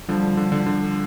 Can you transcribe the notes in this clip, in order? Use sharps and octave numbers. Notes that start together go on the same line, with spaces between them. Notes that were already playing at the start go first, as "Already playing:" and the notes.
D3 F3 G3
D3
D3
D3